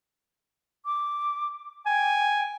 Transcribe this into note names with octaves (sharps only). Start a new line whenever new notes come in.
D6
G5 G#5